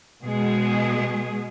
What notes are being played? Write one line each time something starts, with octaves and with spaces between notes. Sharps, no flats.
B2 G#3 G#4